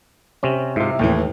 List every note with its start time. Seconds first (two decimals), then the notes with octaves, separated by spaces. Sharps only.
0.43 C3 C4 C#4
0.76 G#2 C3 E4 F4
0.99 D#2 A2 E3 G5